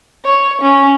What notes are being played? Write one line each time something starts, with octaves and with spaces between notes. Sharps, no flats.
C#5
C#4